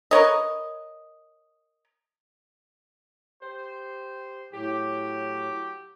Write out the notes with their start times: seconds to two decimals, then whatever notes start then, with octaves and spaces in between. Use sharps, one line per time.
0.11 A#4 B4 C#5 D#5
3.42 G4 C5
4.53 A2 F#3 G4